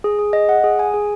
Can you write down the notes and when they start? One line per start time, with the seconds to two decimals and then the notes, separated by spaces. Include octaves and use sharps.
0.04 G#4
0.19 G#4
0.33 D#5
0.49 F#5
0.64 G#4
0.79 G#5
0.94 G#4